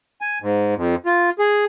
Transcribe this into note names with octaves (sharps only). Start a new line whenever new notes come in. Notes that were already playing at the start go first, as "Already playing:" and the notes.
G#5
G#2
F2
F4
G#4